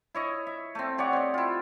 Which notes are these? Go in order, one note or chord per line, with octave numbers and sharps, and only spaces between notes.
E4 C#5 D#5
E5
A3 C4
G4 C#5 D5 F#5
C4 D#5
E4 F4